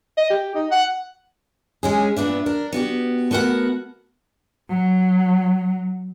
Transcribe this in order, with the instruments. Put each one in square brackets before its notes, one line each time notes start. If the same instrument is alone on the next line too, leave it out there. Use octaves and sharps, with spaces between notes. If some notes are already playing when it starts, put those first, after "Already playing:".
[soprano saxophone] D#5
G4
D#4
F#5
[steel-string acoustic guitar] G#3 C#4 G#4
G2 A#2 B3 D4 E5
D4 A#4
B3 F#4 G4
A3 B3 F#4 A#4 F#5
[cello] F#3